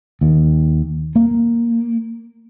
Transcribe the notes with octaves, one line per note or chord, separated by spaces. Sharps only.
D#2
A#3